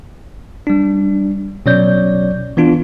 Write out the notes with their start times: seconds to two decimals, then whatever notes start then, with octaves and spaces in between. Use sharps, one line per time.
0.67 G3 D4
1.66 B2 F#3 C#4 C#5 D5 G6
2.57 E3 B3 D4 F4